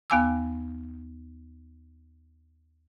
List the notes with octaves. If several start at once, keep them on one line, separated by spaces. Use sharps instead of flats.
D#2 B3 F5 G#5 D6 E6